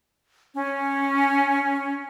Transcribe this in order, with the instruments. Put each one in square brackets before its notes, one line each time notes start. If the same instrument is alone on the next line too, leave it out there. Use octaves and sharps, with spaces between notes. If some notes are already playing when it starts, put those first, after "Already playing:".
[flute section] C#4